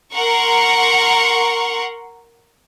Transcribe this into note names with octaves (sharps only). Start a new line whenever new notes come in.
A#4 F#5 A#5 C6 C#6